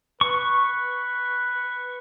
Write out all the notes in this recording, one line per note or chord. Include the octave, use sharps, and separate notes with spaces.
B4 C#6